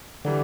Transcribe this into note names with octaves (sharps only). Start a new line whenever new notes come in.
D3 E3 G3